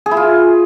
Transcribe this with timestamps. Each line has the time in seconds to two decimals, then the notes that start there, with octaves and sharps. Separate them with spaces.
0.06 G#4
0.11 E4
0.17 F4